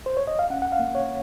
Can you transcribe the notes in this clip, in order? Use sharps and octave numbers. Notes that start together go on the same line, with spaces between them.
C5
C#5
D#5
F5
C#4 F#5
F#5
F5
A#3
C#5